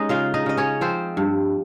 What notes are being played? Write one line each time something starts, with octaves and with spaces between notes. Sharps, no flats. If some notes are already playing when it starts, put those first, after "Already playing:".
Already playing: G#3 C#4 D#4 D#5
C#3 F4 F5
D#4 D#5
C#3 D#5
C#4 C#5
F3 C4 C5
G2